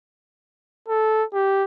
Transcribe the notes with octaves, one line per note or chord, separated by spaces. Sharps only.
A4
G4